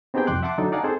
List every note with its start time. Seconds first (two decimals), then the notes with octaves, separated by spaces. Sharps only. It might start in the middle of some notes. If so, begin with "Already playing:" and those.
0.14 B3 C4 D#4 G4 G#4 G5
0.27 C2 F2 G5 C6 D6 F#6
0.43 E5 F#5 A5 C6 D6
0.58 D3 F#3 D4 D#4 A4
0.72 D#4 D5 F5 F#5 G#5 A5
0.84 C4 G#4 A4 C5